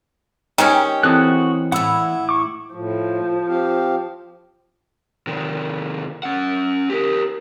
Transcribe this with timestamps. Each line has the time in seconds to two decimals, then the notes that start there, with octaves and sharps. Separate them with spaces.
0.58 D#3 G#3 C#4 G4 G5
1.03 E3 C4 F#4 A4 D#6 F#6
1.72 A2 E4 F#5 B5 E6
2.29 C#6 D6
2.74 A2 F3
3.48 C4 G4 F5
5.27 C3 D#3
6.23 C#4 F#5
6.90 G4 A#4